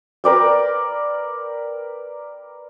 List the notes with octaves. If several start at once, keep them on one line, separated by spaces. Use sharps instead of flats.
A#4 B4 D5 G5